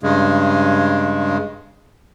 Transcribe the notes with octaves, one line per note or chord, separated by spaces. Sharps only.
G2 C#3 G#3